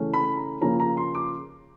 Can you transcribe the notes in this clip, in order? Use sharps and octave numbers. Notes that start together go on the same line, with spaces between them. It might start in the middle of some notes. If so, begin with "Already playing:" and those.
Already playing: C#3 E3 A3 C#4
B5
A#5
C#3 F3 A#3 C#4 A#5
A#5
C6
D6